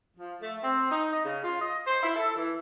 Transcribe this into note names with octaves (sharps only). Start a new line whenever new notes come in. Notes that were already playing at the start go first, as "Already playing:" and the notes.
F3
A3
C4
D#4
D#5
C#3
F4
D#5
C5
E4
A4
E3